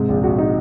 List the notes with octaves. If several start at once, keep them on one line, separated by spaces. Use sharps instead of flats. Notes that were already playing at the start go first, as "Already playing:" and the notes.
Already playing: G#2 C3
A#1
A#1 F#4
D#4